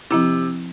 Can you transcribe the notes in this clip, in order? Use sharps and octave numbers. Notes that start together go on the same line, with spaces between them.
C3 F3 C4 E4